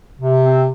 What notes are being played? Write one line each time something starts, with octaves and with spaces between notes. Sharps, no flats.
C3
C4